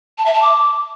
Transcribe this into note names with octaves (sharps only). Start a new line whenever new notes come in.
A5
E5
A5
D6